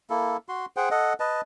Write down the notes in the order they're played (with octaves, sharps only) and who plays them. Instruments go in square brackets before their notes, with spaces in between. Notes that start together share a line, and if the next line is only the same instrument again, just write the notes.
[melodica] A#3 E4 A4
F#4 C6
G#4 C5 F#5 G5
A4 D#5 F#5
B4 D#5 A5